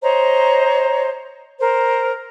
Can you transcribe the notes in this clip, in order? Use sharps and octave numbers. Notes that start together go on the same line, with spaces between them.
C5 C#5 D#5 A#5
A#4 C5